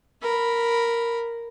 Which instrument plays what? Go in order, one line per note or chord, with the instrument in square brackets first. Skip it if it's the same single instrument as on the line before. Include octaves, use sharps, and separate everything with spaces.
[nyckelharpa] A#4 B5